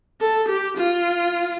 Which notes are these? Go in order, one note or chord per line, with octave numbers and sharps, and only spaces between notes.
A4
G4
F4